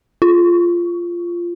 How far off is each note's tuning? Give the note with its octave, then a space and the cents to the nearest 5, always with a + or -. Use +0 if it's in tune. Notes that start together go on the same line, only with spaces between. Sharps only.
F4 -10